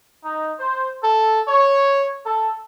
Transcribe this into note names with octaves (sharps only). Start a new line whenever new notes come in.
D#4
C5
A4
C#5
A4